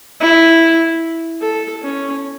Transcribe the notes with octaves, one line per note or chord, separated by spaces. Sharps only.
E4
A4
C#4